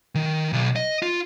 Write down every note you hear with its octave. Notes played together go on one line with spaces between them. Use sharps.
D#3
B1
D#5
F4